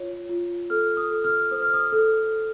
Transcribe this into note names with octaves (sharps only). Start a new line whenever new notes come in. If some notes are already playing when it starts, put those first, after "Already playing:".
Already playing: F4 C#5
F4
A4 F6
D#6
A4
F6
C5 D#6
F6
D#6
A4